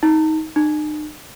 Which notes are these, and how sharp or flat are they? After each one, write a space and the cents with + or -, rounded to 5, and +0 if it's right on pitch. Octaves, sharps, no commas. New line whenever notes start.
D#4 +20
D#4 -45